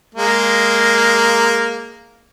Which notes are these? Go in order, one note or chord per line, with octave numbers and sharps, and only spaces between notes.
G#3 A#3